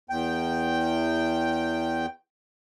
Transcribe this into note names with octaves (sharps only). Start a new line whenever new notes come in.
E2 G5